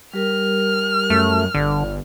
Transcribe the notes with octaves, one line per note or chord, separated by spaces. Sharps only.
G3 G4 A#4 F6
F#2 A3
G1 D3 D5